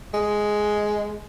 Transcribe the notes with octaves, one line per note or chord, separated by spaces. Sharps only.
G#3